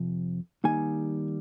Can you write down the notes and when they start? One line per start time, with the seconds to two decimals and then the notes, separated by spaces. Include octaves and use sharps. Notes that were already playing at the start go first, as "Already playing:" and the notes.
Already playing: F2 C3 F3
0.64 D#3 G3 A#3 D#4 G#5